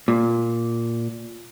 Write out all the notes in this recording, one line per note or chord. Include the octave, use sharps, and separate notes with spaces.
A#2